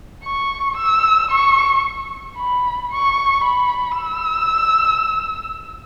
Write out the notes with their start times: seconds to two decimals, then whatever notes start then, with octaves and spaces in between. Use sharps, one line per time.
0.25 C#6
0.77 E6
1.31 C#6
2.37 B5
2.92 C#6
3.44 B5
3.99 E6